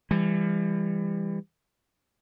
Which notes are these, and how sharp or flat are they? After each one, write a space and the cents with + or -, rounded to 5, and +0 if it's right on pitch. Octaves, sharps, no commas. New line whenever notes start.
E3 +25 G3 +35